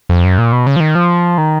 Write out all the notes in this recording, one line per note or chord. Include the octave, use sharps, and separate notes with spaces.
F2
F#2
A#2
B2
C#3
F3
D#3
F3
D#3